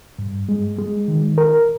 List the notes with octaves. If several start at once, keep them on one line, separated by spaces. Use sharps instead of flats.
G2
G#3
G#3
D#3
A#4